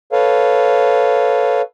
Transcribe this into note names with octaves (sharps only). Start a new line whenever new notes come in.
A4 B4 C#5 F5